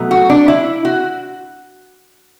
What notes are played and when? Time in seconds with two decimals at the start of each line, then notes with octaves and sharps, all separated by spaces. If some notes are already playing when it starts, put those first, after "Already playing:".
Already playing: B2 F#3 A3
0.11 F#4
0.30 D4
0.48 E4
0.85 F#4